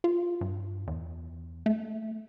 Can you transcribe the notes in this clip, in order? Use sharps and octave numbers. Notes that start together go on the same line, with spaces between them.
F4
G2
E2
A3